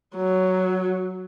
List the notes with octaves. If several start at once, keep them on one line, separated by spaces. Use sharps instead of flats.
F#3